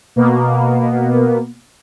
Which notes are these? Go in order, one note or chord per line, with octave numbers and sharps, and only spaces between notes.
B2 A#3 B3